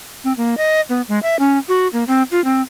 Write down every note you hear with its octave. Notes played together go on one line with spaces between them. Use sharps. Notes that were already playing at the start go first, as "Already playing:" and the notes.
C4
A#3
D#5
B3
G#3
E5
C#4
F#4
A#3
C4
F4
C4